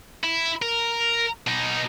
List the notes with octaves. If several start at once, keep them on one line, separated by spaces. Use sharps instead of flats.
E4
A#4
B2 D#4